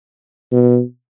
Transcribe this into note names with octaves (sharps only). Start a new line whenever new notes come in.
B2